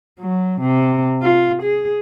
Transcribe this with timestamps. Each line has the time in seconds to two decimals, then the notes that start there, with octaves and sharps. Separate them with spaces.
0.20 F#3
0.61 C3
1.22 F4
1.62 G#4